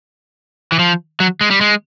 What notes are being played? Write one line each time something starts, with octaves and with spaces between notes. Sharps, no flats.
E3
F3
F#3
G#3
G3
G#3